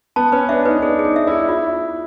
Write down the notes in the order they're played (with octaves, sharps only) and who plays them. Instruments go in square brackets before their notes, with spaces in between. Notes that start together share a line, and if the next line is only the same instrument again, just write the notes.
[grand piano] B3 [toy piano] A5
[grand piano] C#4 [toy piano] B4
[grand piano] D4 [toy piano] E5
[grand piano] D#4 [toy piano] B4
[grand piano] D#4
[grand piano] D4 [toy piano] G#4
[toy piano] G#4
[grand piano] D#4
[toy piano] E5
[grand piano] E4 [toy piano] G#4
[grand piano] E4 [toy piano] F4